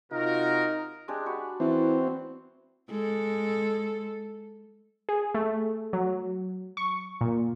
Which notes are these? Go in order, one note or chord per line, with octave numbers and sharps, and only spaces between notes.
C3 D#4 F4 F#4 A#4
G#3 D4 G4
F#4 B5
E3 C4
G#3 A4
G#4
A3
F#3
C#6
A#2